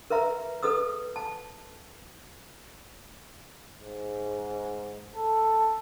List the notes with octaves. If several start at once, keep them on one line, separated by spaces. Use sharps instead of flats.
A#4 B4 E5 A#5
A4 B4 D#6 E6
A5
G#2
A4